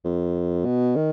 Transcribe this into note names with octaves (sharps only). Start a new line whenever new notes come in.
F2
B2
D#3